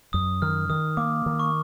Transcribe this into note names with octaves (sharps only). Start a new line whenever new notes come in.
F#2 D#6
D#3 F6
D#3 D#6
A#3 D6
D#3
C#6